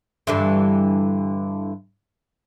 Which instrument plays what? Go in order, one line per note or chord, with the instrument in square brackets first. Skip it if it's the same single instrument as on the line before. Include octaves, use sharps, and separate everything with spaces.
[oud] G2 D3 E3